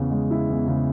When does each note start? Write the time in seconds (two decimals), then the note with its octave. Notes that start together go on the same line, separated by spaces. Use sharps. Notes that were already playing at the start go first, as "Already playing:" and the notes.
Already playing: E2 C#3
0.11 G#3
0.31 E4
0.49 E2
0.68 C#3